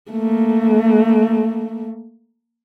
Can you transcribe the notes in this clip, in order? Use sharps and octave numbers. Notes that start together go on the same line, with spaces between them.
A3 A#3